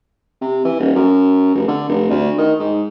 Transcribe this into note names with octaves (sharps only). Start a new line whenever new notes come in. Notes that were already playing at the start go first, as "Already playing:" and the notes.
C3
E3
D#1
F#2
F1
D3
F1
D2
D#3
G#2